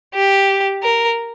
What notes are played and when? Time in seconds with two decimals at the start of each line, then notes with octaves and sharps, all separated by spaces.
0.15 G4
0.83 A#4